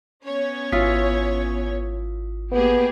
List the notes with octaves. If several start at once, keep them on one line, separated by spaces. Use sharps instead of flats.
B3 C#4 C#5
G#1 E4 F4 D#6 B6
A#3 B3 G4 G#4